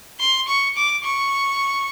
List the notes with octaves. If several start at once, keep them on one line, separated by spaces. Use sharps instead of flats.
C6
C#6
D6
C#6